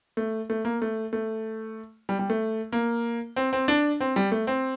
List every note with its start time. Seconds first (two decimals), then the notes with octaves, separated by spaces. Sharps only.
0.17 A3
0.50 A3
0.65 A#3
0.82 A3
1.13 A3
2.09 G3
2.19 G3
2.30 A3
2.72 A#3
3.36 C4
3.53 C4
3.68 D4
4.01 C4
4.16 G3
4.32 A3
4.47 C4